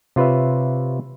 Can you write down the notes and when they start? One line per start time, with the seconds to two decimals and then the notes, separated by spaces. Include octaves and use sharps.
0.16 C3 F4 B4 C#5 E5